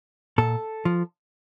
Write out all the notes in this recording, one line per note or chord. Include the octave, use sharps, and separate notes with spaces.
A#2 A4
F3